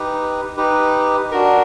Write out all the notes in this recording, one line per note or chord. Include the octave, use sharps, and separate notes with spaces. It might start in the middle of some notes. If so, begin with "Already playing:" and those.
Already playing: D#4 G4 B4
D#4 G4 B4
D4 F#4 A#4